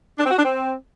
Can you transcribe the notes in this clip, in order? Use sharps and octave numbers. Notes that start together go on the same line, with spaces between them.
D4
C4
F#4
D4
C4